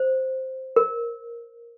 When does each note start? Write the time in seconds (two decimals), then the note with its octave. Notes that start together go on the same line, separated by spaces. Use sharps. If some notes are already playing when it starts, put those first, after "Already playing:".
Already playing: C5
0.76 A#4